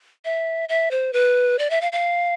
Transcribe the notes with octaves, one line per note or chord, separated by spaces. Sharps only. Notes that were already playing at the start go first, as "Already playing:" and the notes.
E5
E5
C5
B4
D5
E5
F5
F5